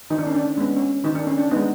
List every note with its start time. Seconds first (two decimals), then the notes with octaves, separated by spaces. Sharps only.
0.10 D#3 D#4
0.18 D4
0.27 C#4
0.35 D4
0.57 G#3 B3 C#4
0.77 C#4
1.04 D#3 D#4
1.15 D4
1.27 C#4
1.38 D4
1.51 G#3 B3 D#4